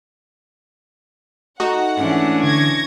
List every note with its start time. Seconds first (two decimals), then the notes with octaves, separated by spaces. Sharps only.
1.60 A3 D#4 F#4 F#5
1.97 G#2 E3 C#4 D4
2.44 D3 C#6 G#6 A#6